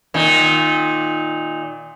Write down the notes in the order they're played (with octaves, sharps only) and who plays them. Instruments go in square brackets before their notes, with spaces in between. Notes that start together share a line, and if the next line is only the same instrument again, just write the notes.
[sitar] A#2 D#3